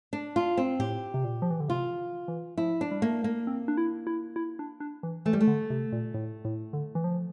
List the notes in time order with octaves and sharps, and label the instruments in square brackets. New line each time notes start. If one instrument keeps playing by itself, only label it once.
[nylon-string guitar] D4
F4
C4
[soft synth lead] A2 [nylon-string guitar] G4
[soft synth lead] C3
A#2
F3
E3
D3
[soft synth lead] C3 [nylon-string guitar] F4
[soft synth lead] E3
[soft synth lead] F3 [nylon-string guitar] E4
[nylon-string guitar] D4
[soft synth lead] G3
[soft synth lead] A3 [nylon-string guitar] A#3
[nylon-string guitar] A#3
[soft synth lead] C4
D4
E4
E4
E4
D4
D4
E3
[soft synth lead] E3 [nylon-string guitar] A3
[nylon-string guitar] G3
A3
[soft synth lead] D3
C3
A#2
A2
A2
D3
E3
F3